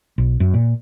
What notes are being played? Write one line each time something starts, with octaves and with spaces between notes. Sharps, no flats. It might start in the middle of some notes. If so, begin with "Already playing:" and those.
B1
F#2
A#2